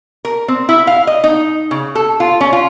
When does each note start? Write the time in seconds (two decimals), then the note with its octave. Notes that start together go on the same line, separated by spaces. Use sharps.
0.25 A#4
0.48 C4
0.69 E4
0.87 F5
1.07 D#5
1.24 D#4
1.71 C#3
1.95 A4
2.20 F4
2.41 C#4
2.53 F4